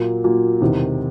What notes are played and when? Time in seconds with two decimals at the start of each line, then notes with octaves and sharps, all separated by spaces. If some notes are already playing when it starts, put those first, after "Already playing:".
Already playing: A#2 F#3 A#3
0.24 A#2 F#3 A#3
0.61 E1 E2 C3 D#3